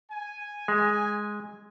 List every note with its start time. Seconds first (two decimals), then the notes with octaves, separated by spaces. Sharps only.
0.12 G#5
0.68 G#3